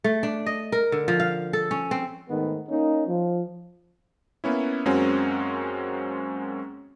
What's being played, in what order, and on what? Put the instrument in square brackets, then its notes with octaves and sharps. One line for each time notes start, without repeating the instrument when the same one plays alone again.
[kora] A3
D4
D#5
A#4
D3
F3
F5
A4
C#4
C4
[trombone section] G#2 D#3 G#3 A3 B3
A#3 C#4 D#4
F3
[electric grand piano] A#3 B3 C#4 E4
F#2 G#3 A#3 C4 C#4 F#4